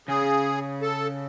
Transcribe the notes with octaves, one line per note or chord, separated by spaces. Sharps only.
C#3 G#4
A4